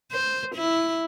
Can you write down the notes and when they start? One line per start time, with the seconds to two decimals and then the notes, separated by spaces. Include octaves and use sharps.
0.12 C5
0.55 E4